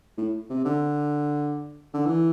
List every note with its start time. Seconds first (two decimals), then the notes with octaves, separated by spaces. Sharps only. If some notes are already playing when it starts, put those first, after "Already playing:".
0.18 A2
0.50 C3
0.65 D3
1.94 D3
2.06 E3